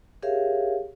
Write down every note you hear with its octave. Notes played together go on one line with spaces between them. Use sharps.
G4 G#4 A#4 C#5 E5 F5